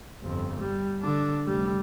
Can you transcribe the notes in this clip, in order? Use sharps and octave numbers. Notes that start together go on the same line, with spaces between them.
G1 F2
G3
D3 D4
F1 G3